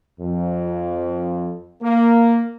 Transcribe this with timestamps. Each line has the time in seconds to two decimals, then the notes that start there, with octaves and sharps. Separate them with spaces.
0.20 F2
1.82 A#3